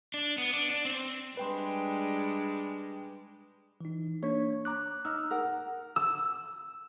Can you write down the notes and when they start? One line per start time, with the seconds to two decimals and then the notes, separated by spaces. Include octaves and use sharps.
0.14 D4
0.38 B3
0.53 D4
0.70 D4
0.85 C4
1.37 G3 G#3 D4 B4 G5 C6
3.81 E3 D#4
4.23 A#3 D4 C#5
4.65 A#5 D6 F#6
5.05 D#4 E6 F6
5.31 A#4 F#5
5.96 E6